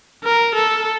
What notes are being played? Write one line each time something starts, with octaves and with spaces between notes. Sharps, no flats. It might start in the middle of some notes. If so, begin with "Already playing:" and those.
A#4
A4